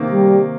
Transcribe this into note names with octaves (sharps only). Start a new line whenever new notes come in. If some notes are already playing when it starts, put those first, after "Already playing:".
Already playing: C3 D#3 A#3
G3